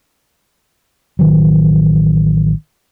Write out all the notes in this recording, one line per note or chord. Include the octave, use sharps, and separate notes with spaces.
A1 D#3 F#3